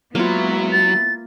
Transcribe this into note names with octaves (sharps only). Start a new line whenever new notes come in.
F#3 G#3 A#3 B3 E4 F4
A6